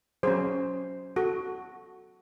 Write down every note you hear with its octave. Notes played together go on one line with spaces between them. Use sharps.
F#3 C#4 G#4 C5
F#4 A4